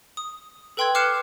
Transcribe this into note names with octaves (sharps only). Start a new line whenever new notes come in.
D#6
A4 B4 G5 C6 E6 G#6
D6 F6 F#6 C7 C#7 E7